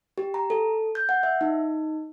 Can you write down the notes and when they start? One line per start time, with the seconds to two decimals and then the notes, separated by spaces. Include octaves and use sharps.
0.18 G4
0.34 A#5
0.50 A4
0.95 G6
1.09 F#5
1.23 E5
1.41 D#4